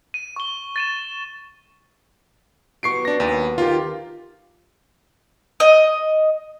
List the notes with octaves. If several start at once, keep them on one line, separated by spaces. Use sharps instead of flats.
D#7
C#6 G7
A6 D#7 E7
F#3 B3 G4 C#6 C7 D7
D4 A#6
D#2
D#3 F4 G4
D#5